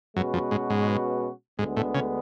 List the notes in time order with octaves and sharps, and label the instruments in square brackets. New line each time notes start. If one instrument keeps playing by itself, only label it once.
[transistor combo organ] F#2 [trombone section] B2 G#3 C#4 F#4 B4
[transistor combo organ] F2
G#2
G#2
[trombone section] D2 D3 G#3 B3 [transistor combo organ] G#2
[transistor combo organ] A2
C#3